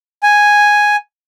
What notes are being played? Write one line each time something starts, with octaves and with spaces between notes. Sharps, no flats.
G#5